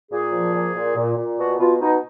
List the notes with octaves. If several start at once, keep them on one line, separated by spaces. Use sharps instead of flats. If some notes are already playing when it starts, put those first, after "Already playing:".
A#2 G#4
F3
A#2
A#2
A#2
A#2
B2 F#4
B2 F4
B2 D#4